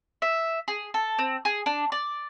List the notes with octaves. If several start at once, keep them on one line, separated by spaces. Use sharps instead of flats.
E5
G#4
A4
C4
G#4
D4
D5